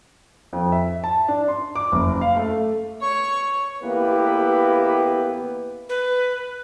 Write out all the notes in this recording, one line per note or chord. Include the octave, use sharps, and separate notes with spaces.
F2
E5
A5
D4
C6
D6
F#1
F5
A3
C#5 C#6
A1 A#3 B3 E4 G4 B4
B4